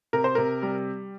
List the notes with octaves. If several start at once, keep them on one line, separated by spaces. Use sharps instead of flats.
C3 A#4
C5
C3 A#4
G3